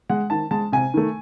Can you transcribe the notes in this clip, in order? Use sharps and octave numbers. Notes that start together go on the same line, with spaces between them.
G#3 F#5
D#3 A5
G#3 A5
C3 G#5
D#3 A3